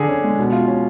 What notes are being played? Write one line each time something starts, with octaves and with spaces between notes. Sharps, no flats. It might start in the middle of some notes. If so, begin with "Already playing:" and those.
Already playing: D3 G#4
C#4
G#3
B2
F4
C#4